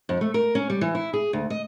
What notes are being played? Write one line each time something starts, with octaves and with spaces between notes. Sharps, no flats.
F2
A3
A#4
C#4
G3
E3
E4
G#4
D2
D#5